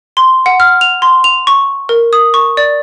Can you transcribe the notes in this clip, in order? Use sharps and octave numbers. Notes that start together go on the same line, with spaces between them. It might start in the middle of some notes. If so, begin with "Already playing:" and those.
C6
F#5
F6
F7
C6
F7
C#6
A#4
D#6
C#6
D5